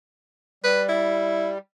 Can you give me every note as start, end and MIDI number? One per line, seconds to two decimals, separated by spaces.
0.64 1.58 55
0.64 0.83 71
0.89 1.51 64